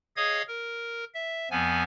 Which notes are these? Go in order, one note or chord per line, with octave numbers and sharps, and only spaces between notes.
G#4 C#5 D#5 F5 D#6 G#6
A#4
E5
F2 F3 B3 G#5